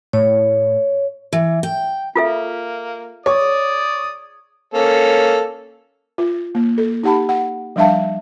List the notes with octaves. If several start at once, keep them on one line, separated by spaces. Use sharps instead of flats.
A2 C#5
E3
G5
A#3 F4 A4 E5
G#4 C#5 D5 D#6
A#3 C#4 A4
F4
A#3
A4
D#4 G4 F#5 A5 B5
F#5
F3 G3 D4 E5 F5 A5